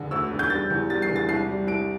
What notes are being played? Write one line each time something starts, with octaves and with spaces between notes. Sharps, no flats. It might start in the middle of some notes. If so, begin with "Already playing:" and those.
Already playing: E1 D3
D2 E6
E1
G6
G3 A6
E2
G3 A6
C7
E2
A6
C2 C7
G3
C2 D7